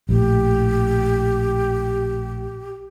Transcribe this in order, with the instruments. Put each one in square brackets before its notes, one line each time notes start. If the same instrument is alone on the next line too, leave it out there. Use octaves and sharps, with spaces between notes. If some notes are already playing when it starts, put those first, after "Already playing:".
[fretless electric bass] A#1 A2 [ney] G4